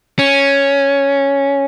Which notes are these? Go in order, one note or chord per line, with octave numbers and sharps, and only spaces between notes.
C#4